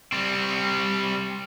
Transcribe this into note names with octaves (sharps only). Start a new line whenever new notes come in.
G3 C4